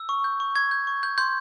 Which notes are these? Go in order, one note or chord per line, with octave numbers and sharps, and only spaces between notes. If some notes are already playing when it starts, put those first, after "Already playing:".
Already playing: E6
C#6
G6
C#6
C#6 G#6
G6
C#6
G6
C6 G6